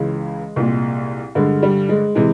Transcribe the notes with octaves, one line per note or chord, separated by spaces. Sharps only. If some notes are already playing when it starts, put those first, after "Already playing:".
Already playing: C#2 C#3 E3 G#3
C2 A#2
G2 D3 G#3
G3
G#3
C3 E3 G#3